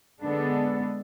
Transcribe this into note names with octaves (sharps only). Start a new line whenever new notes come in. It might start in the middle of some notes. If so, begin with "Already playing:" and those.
D3 G#3 B3 D4 A4